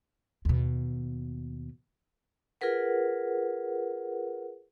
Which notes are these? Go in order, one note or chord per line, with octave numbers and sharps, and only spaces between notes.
D#2 B2
F4 G#4 A#4 B4 F#5